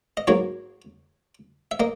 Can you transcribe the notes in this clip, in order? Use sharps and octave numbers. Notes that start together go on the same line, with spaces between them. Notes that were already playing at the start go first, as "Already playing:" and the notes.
D#5
G#2 F#3 A#3 C#5
E5
A#3 D#5